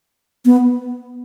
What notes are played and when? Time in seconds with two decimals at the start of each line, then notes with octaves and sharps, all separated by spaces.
0.45 B3